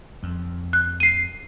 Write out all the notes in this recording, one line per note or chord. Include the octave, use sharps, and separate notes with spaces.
F2
F#6
C7 D#7